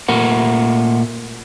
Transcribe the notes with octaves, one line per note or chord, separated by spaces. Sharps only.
A#2 A3 A#4 F#5